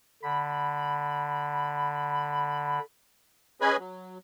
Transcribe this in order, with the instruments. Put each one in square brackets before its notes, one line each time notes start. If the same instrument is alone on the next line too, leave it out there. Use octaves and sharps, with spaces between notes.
[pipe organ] D3 [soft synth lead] B5
[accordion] C#4 G#4 B4 D#5 G#5 B5
F#3